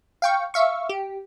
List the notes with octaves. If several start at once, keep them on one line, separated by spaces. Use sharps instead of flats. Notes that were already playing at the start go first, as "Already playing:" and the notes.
F5 G5 C#6
E5 F5 C#6
G4